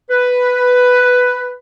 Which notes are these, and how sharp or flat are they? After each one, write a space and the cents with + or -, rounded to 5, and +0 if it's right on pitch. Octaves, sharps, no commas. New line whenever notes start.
B4 +5